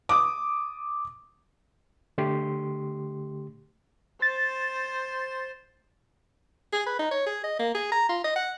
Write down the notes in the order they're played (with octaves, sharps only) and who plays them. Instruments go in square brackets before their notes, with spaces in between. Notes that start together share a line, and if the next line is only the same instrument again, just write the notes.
[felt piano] D6 D#6
[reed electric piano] D3 A3 G4 C6
[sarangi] C5 [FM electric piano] A6
[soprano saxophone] G#4
B4
D#4
C#5
G#4
D#5
A#3
G#4
A#5
F4
D#5
F#5